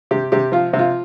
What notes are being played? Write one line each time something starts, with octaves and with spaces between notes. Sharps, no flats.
C3 G4
C3 G4
F3 F4
C3
F4